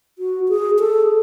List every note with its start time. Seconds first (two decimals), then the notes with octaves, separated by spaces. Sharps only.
0.19 F#4
0.49 G#4
0.79 A4